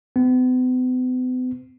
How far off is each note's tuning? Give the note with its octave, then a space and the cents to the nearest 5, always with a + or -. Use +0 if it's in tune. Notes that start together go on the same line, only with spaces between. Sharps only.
B3 +45